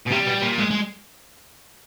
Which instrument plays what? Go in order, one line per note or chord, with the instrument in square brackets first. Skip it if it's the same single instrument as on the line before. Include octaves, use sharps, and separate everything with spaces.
[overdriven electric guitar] B2
[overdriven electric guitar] C3 [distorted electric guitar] G3
[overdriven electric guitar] B2
A#2
[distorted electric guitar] G#3
G#3